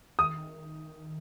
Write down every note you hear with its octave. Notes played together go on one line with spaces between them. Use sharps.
D#3 D#6